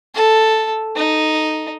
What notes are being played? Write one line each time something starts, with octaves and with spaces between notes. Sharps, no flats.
A4
D#4